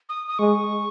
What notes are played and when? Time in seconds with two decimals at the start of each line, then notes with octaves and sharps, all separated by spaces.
0.09 D#6
0.28 D#6
0.39 G#3 C#6